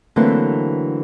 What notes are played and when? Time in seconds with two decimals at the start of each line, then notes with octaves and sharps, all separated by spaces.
0.16 D3 E3 F#3 A3 A#3 C4